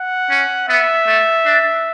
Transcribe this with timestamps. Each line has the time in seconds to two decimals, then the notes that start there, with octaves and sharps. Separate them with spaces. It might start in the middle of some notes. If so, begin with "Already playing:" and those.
Already playing: F#5
0.30 C#4
0.68 B3 E5
1.07 A3
1.45 D4